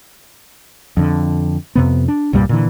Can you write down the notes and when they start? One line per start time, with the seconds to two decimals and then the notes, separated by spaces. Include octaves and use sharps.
0.97 F2 D3
1.75 F2 C3 B3
2.08 D4
2.33 C2 G2 A#2 G3
2.49 A#2 D3 E3